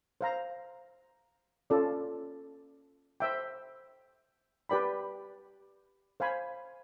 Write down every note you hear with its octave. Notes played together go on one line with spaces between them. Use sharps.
C5 F5 A#5
C#4 F4 A4 D5
C5 E5 G5
G4 B4 D5 G5 B5
C5 F5 G#5 B5